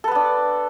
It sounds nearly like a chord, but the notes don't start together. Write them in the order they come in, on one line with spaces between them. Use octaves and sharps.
A4 B4 B3 D4